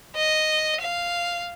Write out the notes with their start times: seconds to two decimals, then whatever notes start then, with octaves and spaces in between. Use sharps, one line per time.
0.16 D#5
0.81 F5